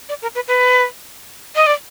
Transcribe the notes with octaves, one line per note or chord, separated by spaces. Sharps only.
D5
A#4
B4
B4
D#5
D5